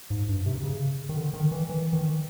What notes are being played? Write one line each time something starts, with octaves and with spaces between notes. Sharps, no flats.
G#2
G2
C3
C#3
D#3
D3
D#3
E3
E3
D#3